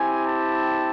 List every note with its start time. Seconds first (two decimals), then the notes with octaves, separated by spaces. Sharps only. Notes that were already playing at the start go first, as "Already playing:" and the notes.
Already playing: C4 E4 G4 G#5
0.24 A5